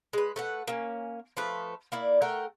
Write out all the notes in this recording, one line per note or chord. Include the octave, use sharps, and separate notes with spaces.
G#3 B4
A3 B4 F#5
A#3 C#4
F3 A3 B4
A#3 E4 D5
A3 A#4 F#5 G5